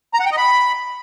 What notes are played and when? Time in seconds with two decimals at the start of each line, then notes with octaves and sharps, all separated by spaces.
0.14 A#5
0.20 F#5
0.26 G5
0.31 D#5
0.37 B5